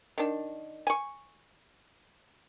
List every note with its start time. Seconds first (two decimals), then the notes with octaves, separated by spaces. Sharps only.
0.18 D#3 D4
0.87 G#5 C#6